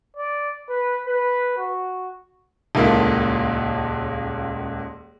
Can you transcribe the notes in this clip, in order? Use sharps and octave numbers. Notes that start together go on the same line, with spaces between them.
D5
B4
B4
F#4
D#1 C#2 A#3 E4 A4